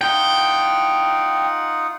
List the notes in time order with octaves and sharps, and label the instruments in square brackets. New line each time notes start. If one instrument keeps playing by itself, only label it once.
[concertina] D#4 F4 F#5 [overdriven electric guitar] G5